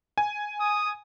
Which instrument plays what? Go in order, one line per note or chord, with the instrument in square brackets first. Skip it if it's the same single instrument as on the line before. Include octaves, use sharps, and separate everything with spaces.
[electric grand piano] G#5
[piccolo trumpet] D#6